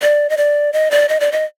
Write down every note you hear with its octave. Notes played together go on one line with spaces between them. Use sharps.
D5
D#5
D5
D#5
D5
D#5
D5
D#5